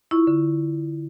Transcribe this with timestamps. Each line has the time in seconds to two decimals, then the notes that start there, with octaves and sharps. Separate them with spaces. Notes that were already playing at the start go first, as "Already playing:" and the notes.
0.11 E4 F4 C#6
0.27 D3